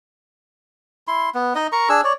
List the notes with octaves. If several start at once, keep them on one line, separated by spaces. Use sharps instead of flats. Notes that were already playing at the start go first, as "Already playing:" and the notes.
E4 C6
B3
D#4 D#5
A#4 A#5 C#6
D4 G#4 E6
C#5 D5